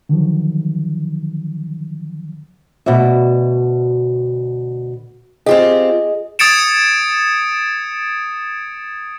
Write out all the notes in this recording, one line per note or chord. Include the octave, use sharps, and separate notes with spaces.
D3 D#3 F3 F#3
D2 B2 F#4 D5 E5
C4 F4 G4 G#4 D#5
D#6 G#6 A6 C#7 D7 E7